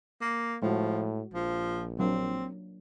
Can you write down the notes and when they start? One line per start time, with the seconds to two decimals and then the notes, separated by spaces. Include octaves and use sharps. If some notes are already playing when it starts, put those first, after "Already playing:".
0.21 A#3
0.62 A2 F3 G#3 F#4
1.34 A#1 F3
1.99 F#3 A#3 C4 D4